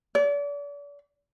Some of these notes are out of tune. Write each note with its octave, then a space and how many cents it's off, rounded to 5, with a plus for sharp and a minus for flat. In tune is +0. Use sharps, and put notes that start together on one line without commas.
D5 -40